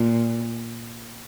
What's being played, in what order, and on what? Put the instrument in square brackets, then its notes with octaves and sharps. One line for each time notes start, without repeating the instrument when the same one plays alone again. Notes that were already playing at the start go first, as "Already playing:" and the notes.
Already playing: [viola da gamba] A#2